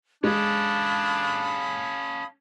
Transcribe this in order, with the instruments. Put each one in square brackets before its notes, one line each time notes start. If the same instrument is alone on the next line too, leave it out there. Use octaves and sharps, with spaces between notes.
[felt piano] G#3 [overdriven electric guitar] C#4 A4 [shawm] D4 [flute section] F5 B5 D#6